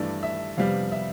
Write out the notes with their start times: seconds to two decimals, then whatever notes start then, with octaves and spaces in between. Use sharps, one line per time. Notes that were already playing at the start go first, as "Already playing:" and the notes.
Already playing: G2 E3 A3 D5
0.23 E5
0.57 F2 C3 G3 B3 F5
0.92 E5